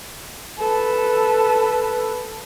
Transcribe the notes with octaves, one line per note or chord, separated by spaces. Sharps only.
A4 B4